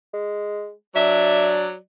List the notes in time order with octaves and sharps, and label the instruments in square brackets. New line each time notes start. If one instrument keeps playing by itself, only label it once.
[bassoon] G#3
[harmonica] F#3 D5 [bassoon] D4 [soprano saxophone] E5